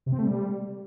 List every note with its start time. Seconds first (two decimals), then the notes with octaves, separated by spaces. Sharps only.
0.06 C3
0.12 C4
0.19 A3
0.25 G3